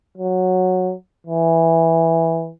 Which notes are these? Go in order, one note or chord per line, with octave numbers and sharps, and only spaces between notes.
F#3
E3